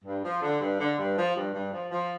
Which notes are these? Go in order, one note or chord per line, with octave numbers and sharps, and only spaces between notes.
G2
F3
D3
G2
D3
G2
F3
G2
G2
F3
F3